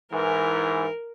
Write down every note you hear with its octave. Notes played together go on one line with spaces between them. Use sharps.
G#2 E3 A#4